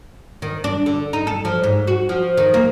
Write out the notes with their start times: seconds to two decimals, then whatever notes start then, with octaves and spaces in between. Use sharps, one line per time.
0.42 D#3
0.64 D4
0.86 D3
1.13 D#4
1.27 A4
1.45 F3
1.63 G#2
1.87 F#4
2.09 F3
2.37 D#3
2.54 A#3